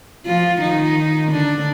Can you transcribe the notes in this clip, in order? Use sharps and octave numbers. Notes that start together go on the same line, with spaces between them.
F3 F4
D#3 D#4
D3 D4